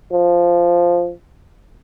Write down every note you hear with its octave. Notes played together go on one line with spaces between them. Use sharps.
F3